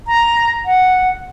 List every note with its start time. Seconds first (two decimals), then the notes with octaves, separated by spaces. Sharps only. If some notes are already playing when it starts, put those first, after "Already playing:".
0.07 A#5
0.65 F#5